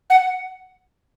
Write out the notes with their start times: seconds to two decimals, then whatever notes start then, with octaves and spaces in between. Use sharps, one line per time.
0.10 F#5